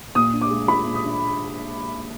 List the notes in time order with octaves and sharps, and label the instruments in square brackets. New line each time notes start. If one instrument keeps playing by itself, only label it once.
[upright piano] A#2 D#6
D4
D6
G#3
F4 B5
A#2
D#6
D4